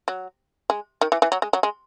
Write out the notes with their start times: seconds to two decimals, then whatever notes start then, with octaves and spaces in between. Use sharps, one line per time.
0.08 F#3
0.70 G#3
1.01 D#3
1.12 E3
1.22 E3
1.32 F#3
1.42 G#3
1.53 F#3
1.63 G#3